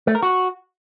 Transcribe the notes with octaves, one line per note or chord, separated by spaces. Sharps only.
A3
A#4
F#4